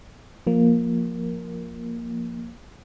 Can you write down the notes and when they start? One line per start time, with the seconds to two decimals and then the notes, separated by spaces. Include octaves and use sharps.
0.47 F3 A#3